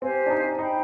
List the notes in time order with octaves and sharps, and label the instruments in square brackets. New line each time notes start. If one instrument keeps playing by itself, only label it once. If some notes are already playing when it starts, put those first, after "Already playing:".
[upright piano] C4 [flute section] G4 C5 F5 G#5
[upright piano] D4
D#4
[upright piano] D#4 [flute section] C5 G5 B5